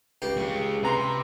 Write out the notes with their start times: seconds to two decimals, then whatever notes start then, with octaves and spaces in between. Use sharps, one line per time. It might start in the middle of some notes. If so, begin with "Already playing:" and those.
0.22 C#2 G4
0.37 G#3 C#4
0.83 C3 B4 A#5 C6